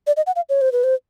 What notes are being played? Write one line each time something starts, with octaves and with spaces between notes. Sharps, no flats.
D5
D#5
F#5
F5
C#5
C5
B4
C5